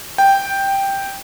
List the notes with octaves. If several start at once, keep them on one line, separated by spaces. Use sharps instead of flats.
G5